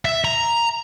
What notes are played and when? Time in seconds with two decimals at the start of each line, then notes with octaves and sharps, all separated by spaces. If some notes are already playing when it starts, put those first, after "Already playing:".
0.05 E5
0.25 A#5